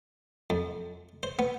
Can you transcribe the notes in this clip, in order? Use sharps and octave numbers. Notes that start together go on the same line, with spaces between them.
F2
C5
B3